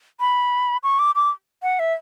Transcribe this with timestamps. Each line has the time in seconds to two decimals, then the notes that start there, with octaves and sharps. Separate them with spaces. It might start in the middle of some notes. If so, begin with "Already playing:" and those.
0.20 B5
0.83 C#6
0.99 D6
1.15 D6
1.63 F#5
1.79 E5